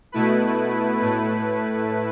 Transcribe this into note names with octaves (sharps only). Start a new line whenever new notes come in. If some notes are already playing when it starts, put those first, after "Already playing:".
B2 A3 E4 B4
A2 A3 E4 B4